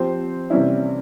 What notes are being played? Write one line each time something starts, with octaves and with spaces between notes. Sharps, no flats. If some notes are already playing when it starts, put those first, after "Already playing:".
Already playing: F3 C4 G4 C5
C3 E3 G3 C#4 E4